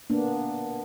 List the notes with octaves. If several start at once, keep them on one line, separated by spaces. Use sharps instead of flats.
A#3 B3 D4